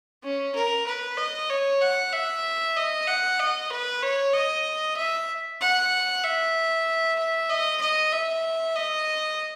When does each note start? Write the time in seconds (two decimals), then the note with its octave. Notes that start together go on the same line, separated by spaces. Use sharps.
0.23 C#4
0.55 A#4
0.86 B4
1.18 D#5
1.50 C#5
1.81 F#5
2.12 E5
2.76 D#5
3.07 F#5
3.40 D#5
3.71 B4
4.02 C#5
4.33 D#5
4.96 E5
5.61 F#5
6.23 E5
7.19 E5
7.50 D#5
7.81 D#5
8.12 E5
8.75 D#5